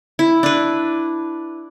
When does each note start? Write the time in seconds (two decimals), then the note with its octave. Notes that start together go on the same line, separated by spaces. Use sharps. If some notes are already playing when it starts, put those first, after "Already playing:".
0.19 E4
0.43 D4 B4